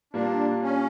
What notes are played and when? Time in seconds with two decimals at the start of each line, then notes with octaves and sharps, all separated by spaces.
0.13 A#2 G3 A#3 D4
0.61 C#4